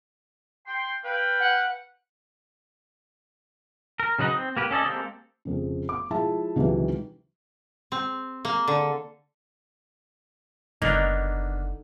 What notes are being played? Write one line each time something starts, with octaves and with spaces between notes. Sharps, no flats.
G5 C6
B4 F5 G5
F#5
A#4
C#3 F#3 D#4 B4 D#5
C4
A#3 G4 B4
C#4 A4 D5 D#5
G#3 A#3 C4 G4 A4
F1 F2 C#3
D6
F3 G#3 E4 E5 A5
C#2 C3 D#3 E3 F#3 G3
C4
A#3
D3
F#1 D3 A#3 B3 D4 D#4